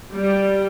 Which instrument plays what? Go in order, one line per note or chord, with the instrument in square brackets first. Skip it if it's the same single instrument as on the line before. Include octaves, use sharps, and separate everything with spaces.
[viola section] G3